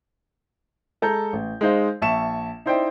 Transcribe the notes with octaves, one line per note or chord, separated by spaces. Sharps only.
G#3 A4 A#5 G6
A1
G#3 D#4 C5 F5
A#1 E5 A5 C#6 E7
D#4 E4 C5 D5 G5